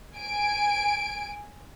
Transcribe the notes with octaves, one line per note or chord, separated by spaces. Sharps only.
G#5 D7